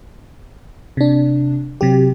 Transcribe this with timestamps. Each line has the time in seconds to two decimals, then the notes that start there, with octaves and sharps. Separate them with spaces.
0.97 C3 D4
1.81 C3 F#3 G4